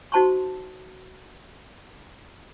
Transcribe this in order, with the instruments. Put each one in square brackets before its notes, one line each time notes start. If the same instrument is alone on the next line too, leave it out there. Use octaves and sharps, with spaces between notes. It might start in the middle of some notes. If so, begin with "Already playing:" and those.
[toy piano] D#4 F#4 C5 A5 C6 C#6